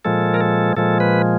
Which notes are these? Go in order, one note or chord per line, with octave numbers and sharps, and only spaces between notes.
A#2 F3 G#3 A4
A#4
A4
A#2 F3 G#3 A4
B4